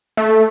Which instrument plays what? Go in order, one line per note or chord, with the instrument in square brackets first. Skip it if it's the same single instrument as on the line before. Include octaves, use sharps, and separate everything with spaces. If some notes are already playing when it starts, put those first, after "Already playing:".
[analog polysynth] A3